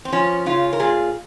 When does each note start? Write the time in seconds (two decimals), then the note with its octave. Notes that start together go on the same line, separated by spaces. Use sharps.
0.05 C4
0.12 F3 C#4
0.46 C#3 C#4 F4
0.73 A#4
0.79 A#2 F4 G#4